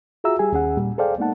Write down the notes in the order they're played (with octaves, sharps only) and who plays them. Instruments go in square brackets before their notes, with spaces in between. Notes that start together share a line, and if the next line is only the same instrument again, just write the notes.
[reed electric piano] F4 F#4 G#4 E5 A#5 E6
G3 G4 G#4 G#5
D#2 C#4 G#4 F#5
A#2 G3
G#4 A4 C5 D5 F5 G5
G#3 A#3 B3 D#4 F#5 A5